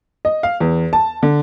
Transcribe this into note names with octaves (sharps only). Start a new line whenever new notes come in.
D#5
F5
E2
A5
D3